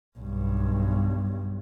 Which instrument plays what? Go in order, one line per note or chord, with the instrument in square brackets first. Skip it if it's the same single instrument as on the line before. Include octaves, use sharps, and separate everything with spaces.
[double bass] B1 G2